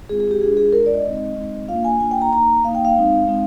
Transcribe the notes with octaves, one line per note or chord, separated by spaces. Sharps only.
G#3 C4 F4 G#4
G#4
G4
G#3 D4 F4 G#4
G#4
G#3 D4 F4 A#4
D5
D#5
G#3 C4 D#4
G#3 C4 D#4
A#3 D4 F4 F5
G#5
A#3 D4 F4 G#5
G5
A#5
A#3 D#4 A#5
A#3 D#4 F5
G5
F5
G#3 C4 D#4
G#3 C4 D#4